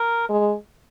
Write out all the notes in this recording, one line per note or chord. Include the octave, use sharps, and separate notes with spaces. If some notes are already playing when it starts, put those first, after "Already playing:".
Already playing: A#4
G#3